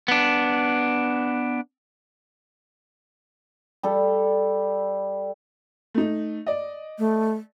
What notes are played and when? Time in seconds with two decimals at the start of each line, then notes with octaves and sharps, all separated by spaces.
0.08 B3 D4
3.83 G3 A4
5.94 A3 D#4
6.46 D5 D#5
6.99 A3